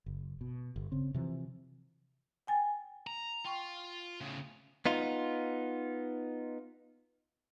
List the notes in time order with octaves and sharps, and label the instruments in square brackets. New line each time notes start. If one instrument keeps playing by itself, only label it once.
[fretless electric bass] F#1
B2
G1
C#3 C4
C3 E3 F3
[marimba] G5 G#5 A6
[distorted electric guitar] A#5
[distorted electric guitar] F4 [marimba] G5 C#6
[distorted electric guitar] A2 C#3
[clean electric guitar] B3 D#4 F4